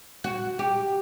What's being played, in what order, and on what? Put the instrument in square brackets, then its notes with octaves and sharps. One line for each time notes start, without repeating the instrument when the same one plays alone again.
[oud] F#4
G4